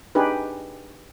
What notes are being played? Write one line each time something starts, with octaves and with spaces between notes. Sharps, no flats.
D4 D#4 G4 G#4 B4